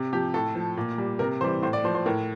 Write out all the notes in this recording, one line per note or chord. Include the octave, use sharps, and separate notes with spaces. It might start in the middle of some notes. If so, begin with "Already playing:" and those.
Already playing: C3
F3 G4
A2 A4
F3
A#2
G3
C3 A#4
E3 G3 C5
A2 C5
D5
F3 C5
C5
A2 A#4